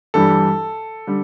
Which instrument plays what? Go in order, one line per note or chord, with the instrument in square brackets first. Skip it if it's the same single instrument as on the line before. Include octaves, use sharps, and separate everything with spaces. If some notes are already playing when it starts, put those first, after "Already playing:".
[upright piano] G2 E3 G3 D4 G4 [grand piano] A4
[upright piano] D3 G3